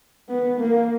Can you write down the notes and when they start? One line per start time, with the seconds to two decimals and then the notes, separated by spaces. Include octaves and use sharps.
0.29 B3
0.60 A#3